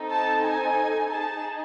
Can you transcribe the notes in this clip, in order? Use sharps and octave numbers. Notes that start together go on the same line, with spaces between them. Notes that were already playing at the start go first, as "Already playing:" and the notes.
Already playing: C4 D#4 A4
A5
G#5
D#4 G#4 A5